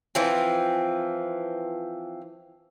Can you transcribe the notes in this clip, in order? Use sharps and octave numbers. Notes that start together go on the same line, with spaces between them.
E3 F3 C4